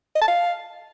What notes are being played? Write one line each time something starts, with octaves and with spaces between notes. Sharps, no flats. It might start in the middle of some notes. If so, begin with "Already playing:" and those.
D#5
A5
F5